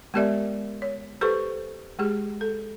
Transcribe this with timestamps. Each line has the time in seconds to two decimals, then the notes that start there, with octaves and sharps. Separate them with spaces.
0.14 G#3 B3 G4 A#4 D5 E5
0.82 C#5
1.21 G4 A4 B4 C5 C#6
1.99 G#3 G4 G#4
2.41 A4